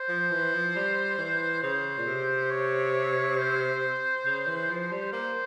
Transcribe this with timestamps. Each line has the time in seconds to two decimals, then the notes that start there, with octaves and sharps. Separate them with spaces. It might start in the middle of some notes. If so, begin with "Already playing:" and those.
Already playing: C5
0.09 F3
0.31 E3
0.53 F3
0.75 G3
1.18 E3
1.63 C#3 C5
1.98 A#2
2.07 C3
2.51 C#5
3.38 C5
4.25 C#3
4.47 E3
4.69 F3
4.91 G3
5.13 A#3 C5